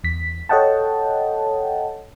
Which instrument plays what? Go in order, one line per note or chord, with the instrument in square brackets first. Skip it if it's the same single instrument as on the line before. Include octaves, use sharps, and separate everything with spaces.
[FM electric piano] E2 B6
A4 C#5 D#5 F#5 G5 A5